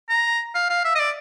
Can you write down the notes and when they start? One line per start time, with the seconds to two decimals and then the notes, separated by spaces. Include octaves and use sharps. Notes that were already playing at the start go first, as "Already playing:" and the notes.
0.09 A#5
0.55 F5
0.69 F5
0.84 E5
0.95 D#5
1.00 D5